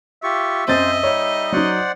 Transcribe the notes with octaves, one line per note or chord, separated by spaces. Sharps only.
F4 G4 E5 C#6
F#2 C4 C5 D#5 A6
G3 D#4 C#5
F#3 D#4 C5 D5 F#5